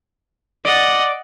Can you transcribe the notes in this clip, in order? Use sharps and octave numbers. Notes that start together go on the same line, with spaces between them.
D5 D#5 F#5